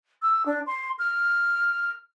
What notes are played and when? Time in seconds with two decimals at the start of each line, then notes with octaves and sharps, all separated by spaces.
0.22 E6
0.45 D4
0.66 C6
0.99 F6